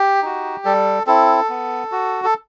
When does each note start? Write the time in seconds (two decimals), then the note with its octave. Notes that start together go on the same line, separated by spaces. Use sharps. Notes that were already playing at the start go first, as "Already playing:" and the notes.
Already playing: G4
0.22 D#4 F#4
0.65 G3 A4
1.07 C4 E4 A4
1.50 B3
1.92 F#4
2.24 A4